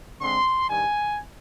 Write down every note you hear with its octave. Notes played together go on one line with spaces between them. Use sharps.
D3 G#3 C4 C6
G2 D#3 G3 G#5